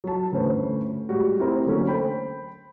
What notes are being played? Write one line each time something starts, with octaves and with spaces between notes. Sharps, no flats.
F#3 A5
G1 D2 A2 C#4 B4 C5
A2 G3 G#3 F#4
C4 E4 G4 A#4 C5 A#5
D3 F#3 A3 A#3 C#4
C5 G5 B5